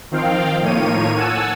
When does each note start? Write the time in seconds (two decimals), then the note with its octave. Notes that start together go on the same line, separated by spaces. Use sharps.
0.11 D#3 F3 C4 F5 G5
0.61 A2 D#3 F3 A#3 C#5 D#7
1.16 F#5 G#5 A5 E6